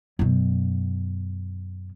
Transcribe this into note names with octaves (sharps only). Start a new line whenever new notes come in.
F#2 B2